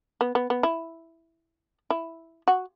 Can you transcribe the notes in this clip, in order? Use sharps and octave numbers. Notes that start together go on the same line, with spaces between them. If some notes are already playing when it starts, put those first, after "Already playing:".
B3
B3
B3
E4
E4
F#4